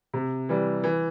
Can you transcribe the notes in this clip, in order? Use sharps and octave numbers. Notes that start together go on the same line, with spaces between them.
C3
E3 G3
E3